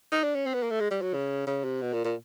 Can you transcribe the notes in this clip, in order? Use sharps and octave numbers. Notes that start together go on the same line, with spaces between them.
D#4
D4
C#4
C4
B3
A#3
A3
G#3
G3
F#3
C#3
C#3
C3
B2
A#2
A#2